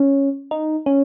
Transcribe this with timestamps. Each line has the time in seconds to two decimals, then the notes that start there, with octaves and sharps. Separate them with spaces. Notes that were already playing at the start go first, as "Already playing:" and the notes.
Already playing: C#4
0.51 D#4
0.86 C#4